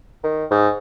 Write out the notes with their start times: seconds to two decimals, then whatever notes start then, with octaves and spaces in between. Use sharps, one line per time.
0.23 D#3
0.51 G#2